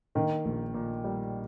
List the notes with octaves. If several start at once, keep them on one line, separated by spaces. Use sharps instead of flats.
D#3 A#3 D#4
A#1
A#2
G3